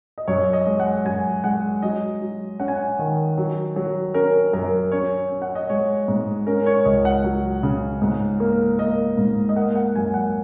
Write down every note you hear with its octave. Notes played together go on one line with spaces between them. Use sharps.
D#5
F#2 C#5
D#5
G#3
F#5
F#2 G#5
G#3 F#5
F#3 D#5
F#3
C#4 F#5
G#5
F#5
D#3
F#3
F#3
C#4 A#4
F#2 A#4
C#4 C#5
C#4
F#5
D#5
G#3 C#5
G#2
C#4 A#4
C#5
C#5
C#2 D#5
F#5
F#3
C#3
G#2
A#3
A#3 D#5
G#2
D#5
A#3 F#5
F#5
F#2 G#5
F#5